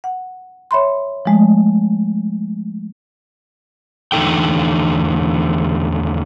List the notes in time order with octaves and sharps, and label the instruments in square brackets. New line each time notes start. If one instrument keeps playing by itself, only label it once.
[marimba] F#5
C#5 E5 B5 C6
F3 G#3 A3
[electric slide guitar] E2 D3 A3 D#4 A4 G5